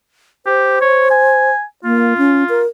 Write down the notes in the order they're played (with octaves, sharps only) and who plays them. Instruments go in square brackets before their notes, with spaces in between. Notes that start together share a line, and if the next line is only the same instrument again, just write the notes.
[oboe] G4 [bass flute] C5
[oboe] C#5
G#5
[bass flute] A#3 [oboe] F4
[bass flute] C#4
A#4